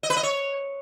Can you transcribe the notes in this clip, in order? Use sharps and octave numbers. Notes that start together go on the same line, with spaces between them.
D#5
B4
D#5
C#5